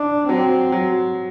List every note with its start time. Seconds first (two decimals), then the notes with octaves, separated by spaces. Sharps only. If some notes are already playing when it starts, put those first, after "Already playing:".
Already playing: D4
0.29 F#3 C4
0.72 F#3